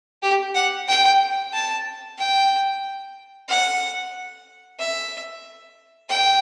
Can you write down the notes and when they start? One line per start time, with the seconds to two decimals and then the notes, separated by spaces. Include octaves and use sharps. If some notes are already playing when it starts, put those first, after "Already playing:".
0.22 G4
0.55 F#5
0.88 G5
1.53 A5
2.18 G5
3.49 F#5
4.80 E5
6.09 G5